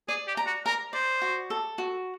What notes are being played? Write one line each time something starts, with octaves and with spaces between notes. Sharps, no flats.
G#4 D5
G4
A#5
F#4
A#4 A#5
C5 D5
F#4
A4
F#4